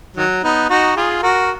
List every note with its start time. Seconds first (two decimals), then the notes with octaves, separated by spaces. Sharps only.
0.17 D#3 F#3
0.43 B3 D#4
0.70 D#4 F#4
0.96 F4 G#4
1.23 F#4 A#4